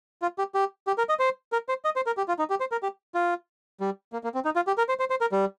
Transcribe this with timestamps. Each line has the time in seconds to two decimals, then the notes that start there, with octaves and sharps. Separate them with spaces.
0.22 F4
0.38 G4
0.55 G4
0.87 G4
0.98 A#4
1.09 D#5
1.19 C5
1.53 A#4
1.69 C5
1.85 D#5
1.96 C5
2.06 A#4
2.17 G4
2.28 F4
2.39 D#4
2.50 G4
2.60 C5
2.72 A#4
2.83 G4
3.15 F4
3.80 G3
4.13 A#3
4.24 A#3
4.35 C4
4.45 D#4
4.56 F4
4.67 G4
4.78 A#4
4.89 C5
5.00 C5
5.10 C5
5.21 A#4
5.32 G3